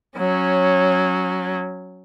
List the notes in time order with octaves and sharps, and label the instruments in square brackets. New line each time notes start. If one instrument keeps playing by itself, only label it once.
[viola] F#3 C#4